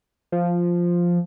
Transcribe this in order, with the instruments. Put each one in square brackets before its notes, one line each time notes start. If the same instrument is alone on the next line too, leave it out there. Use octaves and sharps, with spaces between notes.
[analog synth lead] F3